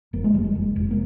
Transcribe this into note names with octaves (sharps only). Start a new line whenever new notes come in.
F1 A#3
G#3
F1 G3
G#3
F1
F1
A#3